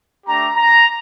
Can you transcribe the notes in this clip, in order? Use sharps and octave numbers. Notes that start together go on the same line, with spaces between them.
A3 D4 G4 A#5
A#5